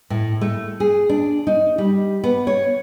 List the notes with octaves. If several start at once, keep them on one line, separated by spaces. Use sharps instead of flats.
A2
A3
G#4
D4
D#4
G3
B3
C#5